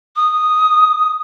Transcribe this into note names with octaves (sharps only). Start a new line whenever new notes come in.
D#6